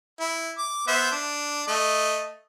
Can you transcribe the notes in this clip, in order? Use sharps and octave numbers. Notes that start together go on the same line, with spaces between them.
E4
D6
B3 C5 E5
D4
A3 D#5